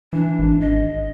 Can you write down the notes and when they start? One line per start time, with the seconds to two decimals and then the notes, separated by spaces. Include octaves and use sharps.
0.13 E3 D4
0.39 G#1
0.61 D#5